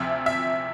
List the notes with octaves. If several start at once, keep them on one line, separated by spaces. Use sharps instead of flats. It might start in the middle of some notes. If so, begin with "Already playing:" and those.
Already playing: D2 C3 F3 E5
E5